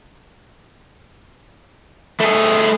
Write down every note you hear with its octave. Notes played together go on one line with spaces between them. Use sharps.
A3 G#4